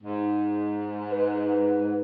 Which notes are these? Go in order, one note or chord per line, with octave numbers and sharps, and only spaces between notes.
G#2
B4